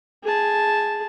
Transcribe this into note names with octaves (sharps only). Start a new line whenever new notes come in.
G#4 A5